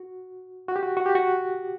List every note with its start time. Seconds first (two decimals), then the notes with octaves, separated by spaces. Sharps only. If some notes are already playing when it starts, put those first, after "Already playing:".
Already playing: F#4
0.68 F#4
0.76 G4
0.83 F#4
0.97 F#4
1.06 G4
1.15 F#4